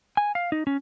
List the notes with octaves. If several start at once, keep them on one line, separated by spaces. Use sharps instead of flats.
G#5
F5
D#4
C#4